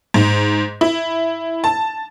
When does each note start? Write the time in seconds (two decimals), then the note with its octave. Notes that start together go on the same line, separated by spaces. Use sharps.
0.14 G#2
0.81 E4
1.64 A5